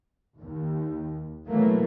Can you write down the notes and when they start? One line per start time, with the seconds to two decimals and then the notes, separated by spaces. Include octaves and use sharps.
0.39 D#2
1.47 B2 E3 F#3 A3 A#3